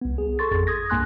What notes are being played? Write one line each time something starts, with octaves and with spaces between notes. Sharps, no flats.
C2 B3
G#4
A4 C6 C#6 A6
G#1 F2 G#4
D#6 G#6 A#6
C2 G2 A#3 G#5 C6 F#6